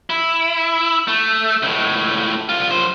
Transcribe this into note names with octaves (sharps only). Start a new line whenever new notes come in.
E4
A3
C#2 A2
C2 F4
F#2 C5